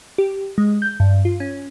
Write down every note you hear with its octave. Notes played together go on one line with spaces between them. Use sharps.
G4
G#3
G6
G2
F4
C#4